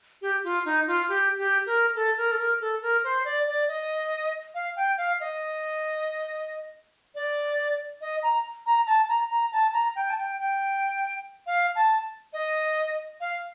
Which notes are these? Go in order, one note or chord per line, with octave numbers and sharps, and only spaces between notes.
G4
F4
D#4
F4
G4
G4
A#4
A4
A#4
A4
A#4
A4
A#4
C5
D5
D5
D#5
F5
G5
F5
D#5
D5
D#5
A#5
A#5
A5
A#5
A#5
A5
A#5
G5
A5
G5
G5
F5
A5
D#5
F5